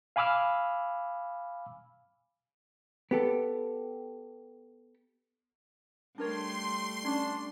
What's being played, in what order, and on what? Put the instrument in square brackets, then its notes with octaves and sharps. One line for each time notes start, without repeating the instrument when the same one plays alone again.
[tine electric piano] F5 G#5 B5 D6 E6 F6
[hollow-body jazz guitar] B3 G4 A4
[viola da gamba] G3 A3 [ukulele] D4 A#4 C#5 [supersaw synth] C6
[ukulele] C#4 [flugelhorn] D4